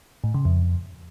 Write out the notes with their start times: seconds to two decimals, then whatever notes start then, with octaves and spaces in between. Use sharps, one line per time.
0.24 A2
0.34 C#3
0.45 F2